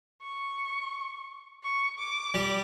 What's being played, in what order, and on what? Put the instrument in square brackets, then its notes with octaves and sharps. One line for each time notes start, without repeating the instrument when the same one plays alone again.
[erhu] C#6
C#6
D6
[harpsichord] G3